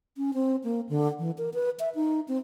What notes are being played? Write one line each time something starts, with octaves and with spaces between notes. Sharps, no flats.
C#4
C4
A#3
D3
E3
A#4
B4
E5
D#4
C4